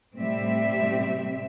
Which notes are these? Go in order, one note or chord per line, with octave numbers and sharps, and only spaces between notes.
A2 C3 G3 C4 E5